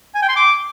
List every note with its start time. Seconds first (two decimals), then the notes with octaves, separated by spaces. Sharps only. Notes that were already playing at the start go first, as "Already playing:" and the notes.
0.15 G#5
0.22 G5
0.29 C6
0.36 D6